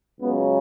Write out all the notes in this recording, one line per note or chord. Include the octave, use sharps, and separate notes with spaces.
C#2 C#3 F#3 B3